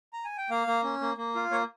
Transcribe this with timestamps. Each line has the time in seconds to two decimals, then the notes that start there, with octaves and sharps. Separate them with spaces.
0.13 A#5
0.24 G#5
0.37 G5
0.50 A#3 F5
0.67 A#3
0.84 C#4
1.01 A#3
1.17 A#3
1.35 F4
1.51 A#3 C#5